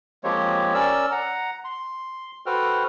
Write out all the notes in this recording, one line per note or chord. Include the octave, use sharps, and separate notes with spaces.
F3 G#3 A#3 C4 G4 C#5
C#4 A#4 D5 E6
F#5 A#5
C6
F#4 A4 B4 C5 G5 F6